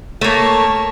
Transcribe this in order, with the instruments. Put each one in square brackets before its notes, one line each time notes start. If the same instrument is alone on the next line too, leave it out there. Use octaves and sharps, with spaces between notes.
[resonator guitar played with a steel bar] A3 A#3 [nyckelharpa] C#5 A5